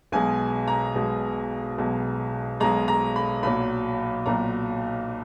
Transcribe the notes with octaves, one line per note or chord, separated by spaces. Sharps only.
B1 B2 G#3 G#5
A#5
B1 B2 G#3
B1 B2 G#3
B1 B2 G#3 A#5
A#5
B5
B1 A#2 F#3 B5
B1 A#2 F#3 A#5